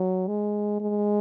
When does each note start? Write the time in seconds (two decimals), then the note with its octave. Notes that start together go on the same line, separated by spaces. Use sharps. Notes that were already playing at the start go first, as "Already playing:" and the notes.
Already playing: F#3
0.28 G#3
0.81 G#3